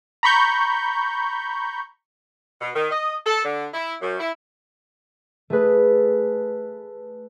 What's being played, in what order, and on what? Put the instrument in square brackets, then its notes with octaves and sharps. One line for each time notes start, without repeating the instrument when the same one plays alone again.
[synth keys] A#5 B5 C#6 G6
[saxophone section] B2
D#3
D#5
A4
D3
E4
F#2
E4
[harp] A3 G#4 B4